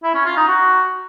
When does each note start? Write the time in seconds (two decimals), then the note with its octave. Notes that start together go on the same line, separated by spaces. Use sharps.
0.03 E4
0.14 C#4
0.25 F4
0.37 D#4
0.48 F#4